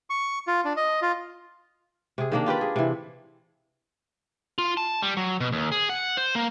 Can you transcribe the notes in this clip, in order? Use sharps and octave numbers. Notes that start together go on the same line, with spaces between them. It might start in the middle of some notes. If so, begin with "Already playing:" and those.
C#6
F4
D4
D#5
F4
C3 G#4
D#3 A#3 D4
F4 G4 B4 D5
G#4
C3 E3
F4
A5
G3
F#3
B2
D#2
G#4
F#5
C5
A#3